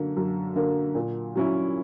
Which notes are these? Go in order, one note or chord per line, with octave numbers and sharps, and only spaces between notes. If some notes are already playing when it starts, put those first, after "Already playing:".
Already playing: F#2 D3 A#3
F#2
D3 A#3
A#2
F#3 C#4 E4